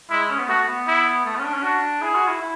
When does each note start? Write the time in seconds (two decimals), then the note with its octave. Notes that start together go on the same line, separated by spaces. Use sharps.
0.10 G#3 E4
0.30 C#4
0.39 B3
0.48 A3 F#4
0.67 B3
0.87 E4
1.25 A3
1.35 B3
1.39 C#4
1.45 D4
1.54 C#4
1.63 D4 F#4
2.02 E4 G#4
2.15 F#4
2.27 E4
2.41 E4